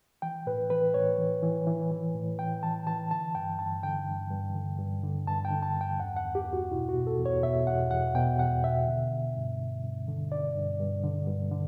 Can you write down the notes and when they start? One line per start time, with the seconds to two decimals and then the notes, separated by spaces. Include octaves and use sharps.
0.22 E3 G5
0.47 A2 B4
0.70 E3 B4
0.94 A2 C#5
1.19 E3
1.43 E3
1.67 E3
1.91 E3
2.15 A2
2.39 E3 G5
2.63 E3 A5
2.86 E3 A5
3.11 D3 A5
3.35 G2 G5
3.59 G2 A5
3.83 D3 G5
4.08 G2
4.31 G2
4.55 D3
4.79 G2
5.03 D3
5.27 G2 A5
5.45 G5
5.50 D3
5.62 A5
5.75 G2
5.81 G5
5.99 E2 F#5
6.17 F#5
6.23 E2
6.35 G4
6.48 E2
6.53 F#4
6.72 B2 E4
6.89 F#4
6.95 B2
7.07 A4
7.19 E2
7.25 C#5
7.43 B2 E5
7.67 E2 F#5
7.91 E2 F#5
8.15 B2 G5
8.39 E2 F#5
8.64 B2 E5
8.88 D3
9.11 D3
9.36 G2
9.59 G2
9.84 G2
10.08 D3
10.32 D3 D5
10.56 G2
10.80 G2
11.04 D3
11.27 G2
11.51 D3